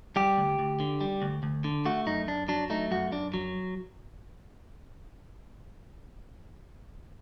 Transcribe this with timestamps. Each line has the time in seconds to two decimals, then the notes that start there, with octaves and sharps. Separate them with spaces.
0.16 G3 G4
0.38 D2
0.59 D2
0.80 D3
1.01 G3
1.22 D2
1.43 D2
1.64 D3
1.85 A3 F#4
2.06 F#2 D#4
2.28 F#2 D4
2.48 F#3 D4
2.70 A3 D#4
2.91 F#2 F#4
3.12 F#2 D4
3.34 F#3